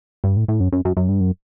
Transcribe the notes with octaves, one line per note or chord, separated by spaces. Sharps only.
G2
A2
A2
F#2
F#2
F#2
F#2
G2
F#2